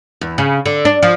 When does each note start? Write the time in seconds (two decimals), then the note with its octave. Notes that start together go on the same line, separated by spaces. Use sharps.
0.21 E2
0.38 C#3
0.66 D3
0.85 D4
1.03 F3